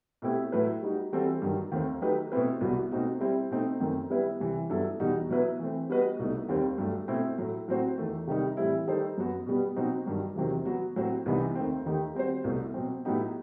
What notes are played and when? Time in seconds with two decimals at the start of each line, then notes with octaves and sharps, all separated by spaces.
0.22 B2 A3 C4 E4 G4
0.52 A2 F#3 A3 E4 B4
0.82 G3 D#4 F#4
1.12 E3 G3 C4 F#4 A4
1.42 G2 D#3 F#3
1.72 D#2 D#3 A3 C4
2.02 F#3 A3 D#4 G4 B4
2.32 B2 A3 C4 E4 B4
2.61 C2 B2 F#3 B3 F#4
2.92 B2 A3 C4 D#4 F#4
3.20 G3 C4 E4
3.51 B2 A3 C4 D#4
3.80 F#2 D#3 A3 C4
4.10 G3 B3 E4 B4 E5
4.40 C2 C3 E3
4.70 G2 F#3 B3 E4 A4
5.00 E2 B2 G3 D#4 F#4
5.29 B2 F#3 B3 E4 B4
5.59 E3 A3 C4
5.89 G3 B3 F#4 B4 D#5
6.19 C2 B2 A3 D#4
6.49 D#2 D#3 G3 C4
6.78 G2 F#3 A3
7.08 B2 A3 C4 E4
7.38 A2 F#3 A3
7.68 A2 F#3 C4 F#4 C5
7.98 E2 D#3 A3
8.27 C3 D#3 G3 D#4
8.57 A2 E3 G3 C4 E4
8.87 D#3 G3 D#4 A4 C5
9.17 F#2 F#3 B3 F#4
9.46 B2 G3 B3
9.76 B2 F#3 C4 D#4 F#4
10.06 G2 D#3 F#3
10.36 E2 C3 D#3 F#3 C4
10.65 F#3 B3 F#4
10.96 A2 F#3 C4 F#4 C5
11.26 C2 C3 E3 B3 D#4
11.55 D#2 D#3 A3 C4
11.86 D#2 D#3 A3 D#4 G4
12.15 G3 C4 F#4 C5
12.44 C2 B2 A3
12.74 B2 F#3 C4
13.05 A2 F#3 B3 D#4 G4